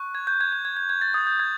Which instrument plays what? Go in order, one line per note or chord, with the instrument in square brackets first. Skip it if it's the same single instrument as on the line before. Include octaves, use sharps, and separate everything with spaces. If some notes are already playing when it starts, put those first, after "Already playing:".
Already playing: [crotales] C#6 F#6
G#6
G6
G#6
G#6
G#6
G#6
G#6
A6
D#6 G6 A6
G6
G#6